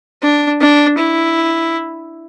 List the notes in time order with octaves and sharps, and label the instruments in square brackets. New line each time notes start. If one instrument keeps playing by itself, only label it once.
[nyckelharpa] D4
D4
E4